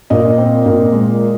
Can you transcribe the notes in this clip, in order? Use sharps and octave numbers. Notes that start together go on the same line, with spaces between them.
A#2 D#5
C4
A#2
G#3